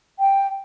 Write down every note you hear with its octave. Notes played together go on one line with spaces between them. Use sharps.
G5